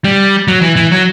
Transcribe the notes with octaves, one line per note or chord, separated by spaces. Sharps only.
G3
F#3
E3
E3
F#3